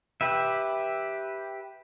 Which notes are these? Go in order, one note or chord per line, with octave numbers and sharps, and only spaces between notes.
G4 B4 E5